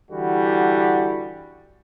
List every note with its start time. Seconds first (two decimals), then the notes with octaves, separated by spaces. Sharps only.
0.11 D3 E3 G3 E4 F#4